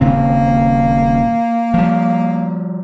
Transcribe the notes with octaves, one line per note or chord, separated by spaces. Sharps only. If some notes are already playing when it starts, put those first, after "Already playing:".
D#1 C#3 A#3 C4
F3 G3